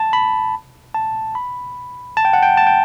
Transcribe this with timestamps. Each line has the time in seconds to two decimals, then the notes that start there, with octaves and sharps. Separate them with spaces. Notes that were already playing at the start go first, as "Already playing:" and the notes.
Already playing: A5
0.13 B5
0.94 A5
1.35 B5
2.17 A5
2.25 G5
2.33 F#5
2.42 G5
2.57 A5
2.67 G5